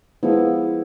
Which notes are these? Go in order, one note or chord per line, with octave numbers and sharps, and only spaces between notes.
F3 G#3 B3 E4